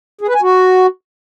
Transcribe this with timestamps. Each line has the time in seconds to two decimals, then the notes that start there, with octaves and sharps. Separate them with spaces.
0.21 G#4
0.28 B4
0.35 G#5
0.42 F#4